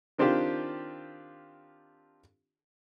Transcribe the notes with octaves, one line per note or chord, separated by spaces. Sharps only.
D#3 C4 D4 F4 G4